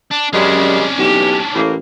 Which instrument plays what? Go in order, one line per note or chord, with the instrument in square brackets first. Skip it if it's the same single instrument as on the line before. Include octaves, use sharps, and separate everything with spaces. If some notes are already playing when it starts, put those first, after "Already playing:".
[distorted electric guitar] D4
[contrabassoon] F#2 [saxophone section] C#3 G3 G#3 [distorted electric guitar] C#4 D4
[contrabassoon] B1 [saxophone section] G2 E3 G4
[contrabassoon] A1 [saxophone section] A2 A#3